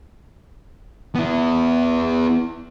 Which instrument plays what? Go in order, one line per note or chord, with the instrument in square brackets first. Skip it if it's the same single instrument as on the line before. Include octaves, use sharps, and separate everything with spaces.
[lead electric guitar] B3 E4